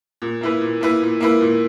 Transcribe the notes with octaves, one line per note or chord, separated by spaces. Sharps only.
A#2
A#3 E4 B4
A#2
A#3 E4 B4
A#2
A#3 E4 B4
A#2